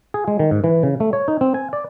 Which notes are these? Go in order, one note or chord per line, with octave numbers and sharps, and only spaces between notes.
G#4
G#3
D#3
G#2
E3
C#3
A3
C#5
D#4
C4
G#5
D5